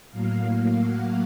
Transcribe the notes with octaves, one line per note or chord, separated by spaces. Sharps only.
A2 F#3 A#3 F5
F#5